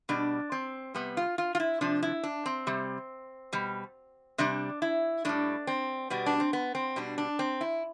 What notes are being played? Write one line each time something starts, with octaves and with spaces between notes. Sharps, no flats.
B2 G3 D4
C4
C3 G3 B3
F4
F4
F4
E4
C3 F3 D4
E4
D4
C4
C3 G3
B2 G3
C3 G3 D4
E4
A2 G3 D4
C4
B2 G3 B3
D4
C4
B3
C4
B2 G3 D4
D4
C4
E4